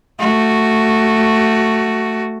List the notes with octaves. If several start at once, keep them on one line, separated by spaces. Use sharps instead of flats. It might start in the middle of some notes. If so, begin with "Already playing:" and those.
A3 F#4